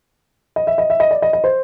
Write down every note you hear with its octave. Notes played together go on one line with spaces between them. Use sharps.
D#5
E5
D#5
E5
D#5
D5
D#5
D#5
C5